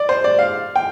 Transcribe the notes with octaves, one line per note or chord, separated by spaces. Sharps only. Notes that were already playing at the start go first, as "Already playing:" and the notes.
Already playing: D5
C5
D5
F5
G5